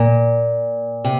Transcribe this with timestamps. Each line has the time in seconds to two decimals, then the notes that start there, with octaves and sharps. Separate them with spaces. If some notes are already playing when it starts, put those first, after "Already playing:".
Already playing: A#2
1.04 C3